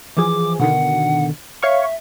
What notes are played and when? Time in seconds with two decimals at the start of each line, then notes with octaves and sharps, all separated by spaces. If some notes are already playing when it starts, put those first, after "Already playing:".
0.17 E3 F3 G#4 D6
0.60 B2 D3 D#3 F#5
1.62 C#5 E5 F5 C#6